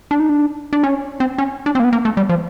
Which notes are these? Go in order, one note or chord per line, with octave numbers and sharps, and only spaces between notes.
D4
D#4
D4
D4
C#4
C4
C#4
D4
C4
A#3
B3
A#3
A3
G3
F3